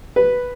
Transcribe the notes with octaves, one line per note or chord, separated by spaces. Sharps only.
B4